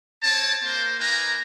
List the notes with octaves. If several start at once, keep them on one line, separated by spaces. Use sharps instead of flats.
C4 C#5 A5
A#3 C5
A#3 D#4 B4 G#5 A#5